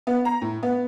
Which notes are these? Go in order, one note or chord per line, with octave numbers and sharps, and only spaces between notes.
B3
A#5
A2
B3